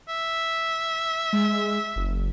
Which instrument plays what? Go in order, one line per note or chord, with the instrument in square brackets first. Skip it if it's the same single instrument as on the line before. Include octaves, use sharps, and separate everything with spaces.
[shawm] E5
[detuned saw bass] G#3
F#1